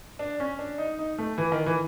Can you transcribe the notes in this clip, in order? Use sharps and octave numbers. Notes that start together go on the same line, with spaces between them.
D4
C#4
D4
D#4
D#4
A3
E3
D#3
E3